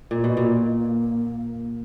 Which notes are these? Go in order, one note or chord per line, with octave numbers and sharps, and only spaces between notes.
A#2 A#3
B2
A#2